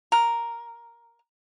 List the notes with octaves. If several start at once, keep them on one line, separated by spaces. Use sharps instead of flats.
A#4